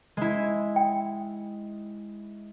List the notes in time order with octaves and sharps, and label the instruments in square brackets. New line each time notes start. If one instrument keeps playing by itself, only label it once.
[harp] G#3 E4
[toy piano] G5